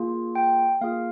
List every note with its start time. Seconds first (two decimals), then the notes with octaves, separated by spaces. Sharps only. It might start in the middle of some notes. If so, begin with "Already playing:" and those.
Already playing: A#3 F4 G#4
0.35 G5
0.81 A#3 F4 G#4 F5